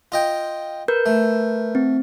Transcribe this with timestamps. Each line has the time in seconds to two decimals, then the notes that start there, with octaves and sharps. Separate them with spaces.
0.12 F4 D#5 G5
0.88 A#4 B4 G6
1.06 A3
1.75 C4